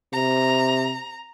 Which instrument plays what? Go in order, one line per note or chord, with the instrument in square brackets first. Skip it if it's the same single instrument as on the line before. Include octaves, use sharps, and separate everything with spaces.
[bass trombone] C3 [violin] A#5